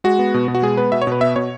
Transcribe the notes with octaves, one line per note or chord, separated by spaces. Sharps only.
G#3 F#4
B3
B2
B2
F#4
G#3 G#4
B3 B4
B2 E5
C#5
B2 B4
B3 E5
B2 C#5